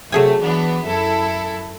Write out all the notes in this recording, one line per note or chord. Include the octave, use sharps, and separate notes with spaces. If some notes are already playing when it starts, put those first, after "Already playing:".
C3 F#3 A3 G#4 G#5
E3 B3 D4
F#2 E4 A4